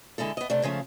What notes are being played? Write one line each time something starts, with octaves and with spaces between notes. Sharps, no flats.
D3 G#3 E4 A4
B3 D#5
C3 A3 D4
G#2 C#3 F3 A3